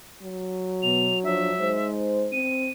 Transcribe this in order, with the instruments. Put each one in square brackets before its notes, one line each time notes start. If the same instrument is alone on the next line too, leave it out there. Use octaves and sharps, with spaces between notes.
[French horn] F#3
[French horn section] B2 [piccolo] F7
[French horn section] F3 D4 C#5 [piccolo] E5
[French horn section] G#3 D#4 C5
[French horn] C4 [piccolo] D#7